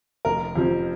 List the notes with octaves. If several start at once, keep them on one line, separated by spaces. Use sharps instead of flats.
F1 A#4
F2 C3 F3